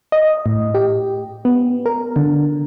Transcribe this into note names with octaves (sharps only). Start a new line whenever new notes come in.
D#5
A2
G4
B3
A#4
D3